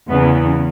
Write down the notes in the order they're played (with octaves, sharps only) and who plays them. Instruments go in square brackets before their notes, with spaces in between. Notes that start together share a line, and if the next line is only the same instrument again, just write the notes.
[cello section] E2 C#3 E3 B3